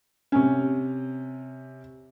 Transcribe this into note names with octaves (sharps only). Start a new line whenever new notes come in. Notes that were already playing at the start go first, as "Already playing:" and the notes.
C3 C#4